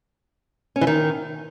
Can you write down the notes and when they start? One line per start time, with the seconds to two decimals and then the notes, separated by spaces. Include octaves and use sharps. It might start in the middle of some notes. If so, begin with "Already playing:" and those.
0.76 C#4
0.81 E3
0.87 D#3